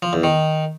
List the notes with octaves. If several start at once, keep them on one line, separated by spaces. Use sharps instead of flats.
F3
E2
D#3